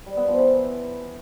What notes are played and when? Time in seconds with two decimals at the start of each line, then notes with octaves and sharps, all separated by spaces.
0.06 G3
0.17 B3
0.28 F3
0.38 E3